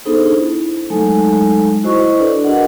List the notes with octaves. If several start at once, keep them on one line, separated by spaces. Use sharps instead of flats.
B3 D4 D#4 G#4 A4 C5
E4
F#3 G#3 A3 D#4 A4 G#5
E4 F#4 C5 D#5 C#6
D4 F#4 A4 B4 D5
D4 G#4 A#4 D#5 F#5